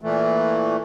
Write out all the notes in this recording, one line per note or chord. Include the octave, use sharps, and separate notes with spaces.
A#2 E3 A3